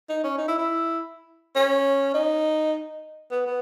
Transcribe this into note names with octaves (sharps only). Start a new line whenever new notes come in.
D#4
C#4
D#4
E4
E4
C#4
D#4
B3
B3